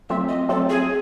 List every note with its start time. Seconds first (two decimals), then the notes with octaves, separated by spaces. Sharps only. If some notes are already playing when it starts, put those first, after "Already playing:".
0.10 F#3 A3 C4 F4 E5
0.29 D#5
0.49 F#3 A3 C4 F4 A4
0.70 G#4